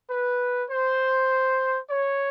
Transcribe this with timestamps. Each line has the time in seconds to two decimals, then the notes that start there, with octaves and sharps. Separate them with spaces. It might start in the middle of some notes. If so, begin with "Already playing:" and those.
0.10 B4
0.70 C5
1.90 C#5